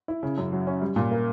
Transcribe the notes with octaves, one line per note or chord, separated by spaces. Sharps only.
E4
C#3
F#2
F#3
C#4
G3
A#2
A#3